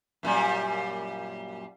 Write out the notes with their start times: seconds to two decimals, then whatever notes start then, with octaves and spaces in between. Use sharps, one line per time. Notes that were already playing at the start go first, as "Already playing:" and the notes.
0.23 F#2 A#2 G3